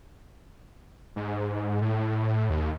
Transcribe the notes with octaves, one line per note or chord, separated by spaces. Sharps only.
G#2
A2
D#2